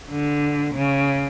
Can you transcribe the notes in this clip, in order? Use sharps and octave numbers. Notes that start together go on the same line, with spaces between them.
D3
C#3